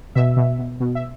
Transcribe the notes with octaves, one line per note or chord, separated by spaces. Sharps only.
B2 E5
B2
B2
B2
E5